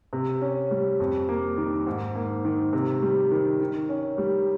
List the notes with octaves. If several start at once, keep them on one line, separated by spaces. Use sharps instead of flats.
C3
C#4
G3
F2
A#3
D#3
G#2
A#3
D#3
C3
G3
D#3
D#3
C#4
G3